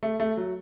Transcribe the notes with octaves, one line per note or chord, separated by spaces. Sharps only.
A3
A3
F#3